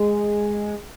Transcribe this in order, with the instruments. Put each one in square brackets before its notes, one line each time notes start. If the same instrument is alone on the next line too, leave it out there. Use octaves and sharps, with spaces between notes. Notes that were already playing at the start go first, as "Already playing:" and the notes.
Already playing: [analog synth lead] G#3